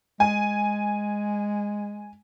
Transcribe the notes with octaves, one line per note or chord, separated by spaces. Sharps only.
G#3 G#5